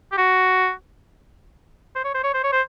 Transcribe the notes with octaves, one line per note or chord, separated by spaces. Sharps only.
G4
F#4
C5
C#5
C5
C#5
C5
C#5
C5